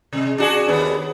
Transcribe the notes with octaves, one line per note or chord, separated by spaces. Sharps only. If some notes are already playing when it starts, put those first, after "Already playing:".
C3 G#3
D4 F#4 G#4
D#2 B3